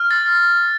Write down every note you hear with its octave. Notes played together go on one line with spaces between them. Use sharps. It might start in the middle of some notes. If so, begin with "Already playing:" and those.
Already playing: F6
A6